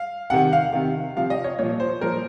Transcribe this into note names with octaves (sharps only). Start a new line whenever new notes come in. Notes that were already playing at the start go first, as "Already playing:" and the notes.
Already playing: F5
C3 D#3 F#5
F5
C3 D#3
C3 F3 F5
D#5
C#5
A#2 F3 C#5
C5
A#2 F3 A#4